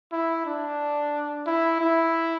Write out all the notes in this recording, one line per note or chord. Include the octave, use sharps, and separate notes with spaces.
E4
D4
E4
E4